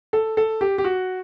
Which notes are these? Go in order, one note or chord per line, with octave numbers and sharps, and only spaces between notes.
A4
A4
G4
G4
F#4